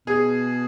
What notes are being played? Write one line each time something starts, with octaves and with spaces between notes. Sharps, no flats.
B2 G#4